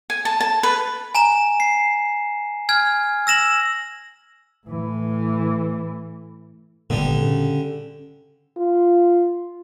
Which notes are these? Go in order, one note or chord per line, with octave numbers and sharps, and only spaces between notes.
G#5
A5
A5
B4
G#5 A#5 E7
C7
G#5 F6 G#6
E6 A#6 E7 F#7
A2 E3
G#1 A#2 D3 G3 B3
C#3
F4